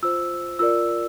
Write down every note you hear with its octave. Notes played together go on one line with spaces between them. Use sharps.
F4 C5 E6
F4 A#4 D5 E6